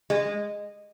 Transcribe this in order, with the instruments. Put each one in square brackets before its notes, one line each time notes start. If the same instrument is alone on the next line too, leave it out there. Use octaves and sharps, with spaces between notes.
[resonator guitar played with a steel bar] G#3